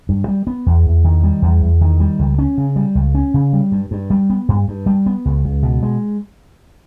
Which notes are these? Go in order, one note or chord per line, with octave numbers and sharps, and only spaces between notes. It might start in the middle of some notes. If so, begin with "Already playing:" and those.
G2
G3
B3
E2
E2
D#3
G3
E2
E2
D#3
G3
C#2
C#4
C#3
G3
C#2
C#4
C#3
G3
G2
G2
G3
B3
G2
G2
G3
B3
C#2
C#2
B2
G#3